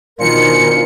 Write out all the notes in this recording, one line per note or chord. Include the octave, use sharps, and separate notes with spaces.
B2 D#3 D4 F4 A#4 C5 G#5 C#7